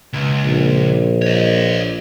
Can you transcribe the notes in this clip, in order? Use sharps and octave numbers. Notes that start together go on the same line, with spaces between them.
C#2
A#1
C#5 D#5